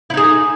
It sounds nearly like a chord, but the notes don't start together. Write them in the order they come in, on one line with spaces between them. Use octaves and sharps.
E4 D#4 G#4